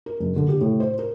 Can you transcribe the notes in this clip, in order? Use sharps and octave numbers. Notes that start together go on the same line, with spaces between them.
A#4
F#1
D3
G4
A2
C5
A#4